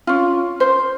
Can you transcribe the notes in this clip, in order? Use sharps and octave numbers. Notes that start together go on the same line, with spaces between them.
C#4 F4
C5